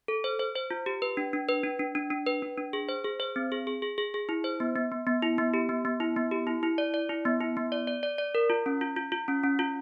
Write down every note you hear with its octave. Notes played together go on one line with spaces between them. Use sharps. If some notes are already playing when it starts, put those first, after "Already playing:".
A4
C5
C5
C5
F4
G4
B4
D4
D4
B4
D4
D4
D4
D4
B4
D4
D4
G#4
C5
G#4
C5
C4
G#4
G#4
G#4
G#4
G#4
E4
C5
B3
B3
B3
B3
E4
B3
G4
B3
B3
E4
B3
G4
E4
E4
D5
D5
E4
B3
E4
B3
D5
D5
D5
D5
A#4
F4
C#4
F4
F4
F4
C#4
C#4
F4